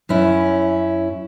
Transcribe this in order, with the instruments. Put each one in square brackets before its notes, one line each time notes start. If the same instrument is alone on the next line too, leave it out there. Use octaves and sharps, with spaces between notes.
[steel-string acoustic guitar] F#2 C#4 E4